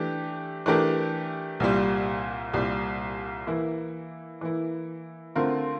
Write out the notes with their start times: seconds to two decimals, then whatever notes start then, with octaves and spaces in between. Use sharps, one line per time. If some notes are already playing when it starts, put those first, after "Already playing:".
Already playing: E3 A3 D4 G4
0.66 E3 A3 D4 G4 A#4
1.60 C2 A#2 G3
2.53 C2 A#2 G3
3.47 E3 A#3 E4
4.41 E3 A#3 E4
5.35 D3 A3 C4 F4 A#4